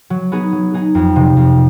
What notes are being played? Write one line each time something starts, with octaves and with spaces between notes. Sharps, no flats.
F#3
B3 D#4 G#4
F#3
B3 D#4 G#4
F2
C3 F3
F2